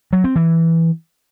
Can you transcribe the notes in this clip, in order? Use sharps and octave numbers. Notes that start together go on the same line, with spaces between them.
F#3
C4
E3